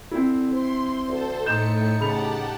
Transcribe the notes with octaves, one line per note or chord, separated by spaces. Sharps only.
D3 C4 E4
C5 C6
D2 A4 C5
A2 A3 D#4 G6 C#7 E7
C#3 G4 F#5 A5 B5 F7